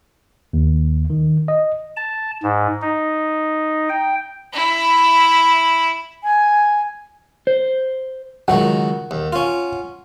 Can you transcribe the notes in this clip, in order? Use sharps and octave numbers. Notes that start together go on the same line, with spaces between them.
D#2
D#3
D#5
A5
G#2
D#4
G5
E4
G#5
C5
C#2 D#3 F#3 F#5
D#2
C#4 F4